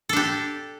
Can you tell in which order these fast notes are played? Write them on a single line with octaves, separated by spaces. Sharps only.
A4 D4 G4